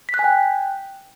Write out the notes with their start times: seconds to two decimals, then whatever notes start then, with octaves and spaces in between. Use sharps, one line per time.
0.09 B6
0.14 F#6
0.19 G#5
0.24 G5